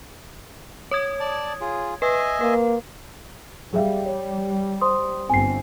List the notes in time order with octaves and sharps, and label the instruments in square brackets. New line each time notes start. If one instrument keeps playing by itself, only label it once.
[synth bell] C#5 D#6 G#6
[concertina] D5 A5
F4 G#4
[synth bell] B4 [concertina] D#5 E5 G#5
[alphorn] A#3 [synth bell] B4
[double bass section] G3 [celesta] G#4 E5 F5
[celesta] C#5
C5 C6 D#6
[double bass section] G1 C4 [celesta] G#5 C7